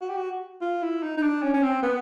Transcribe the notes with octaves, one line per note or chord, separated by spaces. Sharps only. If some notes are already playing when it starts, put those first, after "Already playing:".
F#4
G4
F#4
F4
E4
D#4
D#4
D4
C#4
C#4
C4
B3